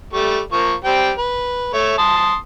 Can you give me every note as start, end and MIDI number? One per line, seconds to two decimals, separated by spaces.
0.14 0.40 55
0.14 0.40 57
0.14 0.40 85
0.52 0.74 53
0.52 0.74 58
0.52 0.74 85
0.84 1.11 55
0.84 1.11 60
0.84 1.11 79
1.18 1.70 71
1.74 1.97 57
1.74 1.97 73
1.74 1.97 76
1.98 2.36 81
1.98 2.36 84
1.98 2.36 87